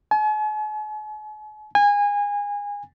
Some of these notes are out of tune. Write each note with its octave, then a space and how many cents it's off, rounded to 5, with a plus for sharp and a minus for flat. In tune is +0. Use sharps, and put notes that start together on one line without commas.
G#5 +45
G#5 -25